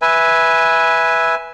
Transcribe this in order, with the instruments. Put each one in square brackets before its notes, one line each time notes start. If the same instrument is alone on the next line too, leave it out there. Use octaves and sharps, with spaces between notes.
[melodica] B4 E5 G#5